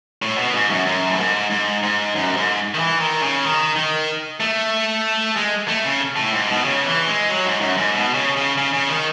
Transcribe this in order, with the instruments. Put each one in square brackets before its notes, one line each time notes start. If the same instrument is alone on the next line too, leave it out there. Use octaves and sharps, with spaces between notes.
[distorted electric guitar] A2
B2
G#2
F#2
F#2
A2
G#2
G#2
G#2
F#2
G#2
D#3
E3
D#3
C#3
D#3
D#3
A3
G#3
A3
C#3
A2
G#2
B2
C#3
E3
G#3
F#3
G#2
F#2
G#2
B2
C#3
C#3
C#3
C#3
D#3